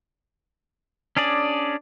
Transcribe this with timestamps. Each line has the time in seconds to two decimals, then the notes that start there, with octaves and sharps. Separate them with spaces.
1.17 C#4 D4 G#4 D5